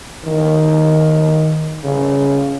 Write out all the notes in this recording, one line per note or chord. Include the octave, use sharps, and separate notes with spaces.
D#3
C#3